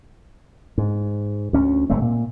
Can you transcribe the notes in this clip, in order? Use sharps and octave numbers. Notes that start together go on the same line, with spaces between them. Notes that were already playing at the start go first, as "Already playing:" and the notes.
G#2
D2 C#4
F#1 G#2 A3 C4
A#2